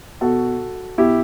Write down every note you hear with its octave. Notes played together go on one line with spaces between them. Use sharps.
B2 F#4 A4
B2 E4 G4